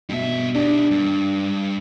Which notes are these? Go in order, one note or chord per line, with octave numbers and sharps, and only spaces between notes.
G2 B2 E5
D4 G4 A#4
G2